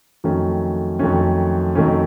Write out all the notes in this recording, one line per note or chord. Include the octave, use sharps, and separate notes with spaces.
F2 D#3 F#3 A3 C#4
F2 D#3 F#3 A3 C#4
F2 D#3 F#3 A3 C#4